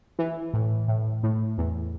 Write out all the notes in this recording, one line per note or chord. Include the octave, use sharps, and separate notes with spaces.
E3
A2
A2
A2
E2